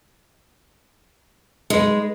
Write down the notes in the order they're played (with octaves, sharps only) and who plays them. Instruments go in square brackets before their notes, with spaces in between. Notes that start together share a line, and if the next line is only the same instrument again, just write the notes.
[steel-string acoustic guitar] G#3 [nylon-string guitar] D#4 B4